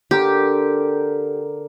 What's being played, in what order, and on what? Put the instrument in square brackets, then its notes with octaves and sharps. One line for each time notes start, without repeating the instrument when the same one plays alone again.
[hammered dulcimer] D3 A#4 [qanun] G4